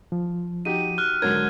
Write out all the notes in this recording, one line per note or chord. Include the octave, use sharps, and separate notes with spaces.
F3
D#4 F#4 G4 D#7
F6 F#6
G#2 D3 F#3 A#4 G#6